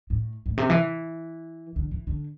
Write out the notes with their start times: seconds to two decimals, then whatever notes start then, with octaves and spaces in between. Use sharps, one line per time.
0.10 A2
0.46 A2
0.58 C3
0.70 E3
1.76 D3
1.91 E3
2.07 D3